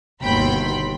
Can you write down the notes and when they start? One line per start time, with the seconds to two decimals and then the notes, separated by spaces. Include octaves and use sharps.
0.23 G1 D#2 B2 G5 B5 C6